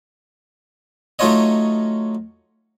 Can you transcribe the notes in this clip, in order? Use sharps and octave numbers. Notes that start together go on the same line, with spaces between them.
F#3 A3 D#4 F4 C#5 D#5